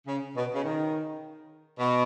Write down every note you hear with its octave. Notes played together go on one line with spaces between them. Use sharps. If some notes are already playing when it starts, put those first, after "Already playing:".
C#3
B2
C#3
D#3
B2